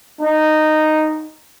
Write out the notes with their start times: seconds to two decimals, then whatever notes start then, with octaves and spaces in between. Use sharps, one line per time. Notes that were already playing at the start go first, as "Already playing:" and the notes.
0.20 D#4